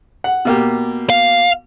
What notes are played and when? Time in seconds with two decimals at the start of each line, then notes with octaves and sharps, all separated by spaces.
0.24 F#5
0.45 B2 A#3 G4
1.10 F5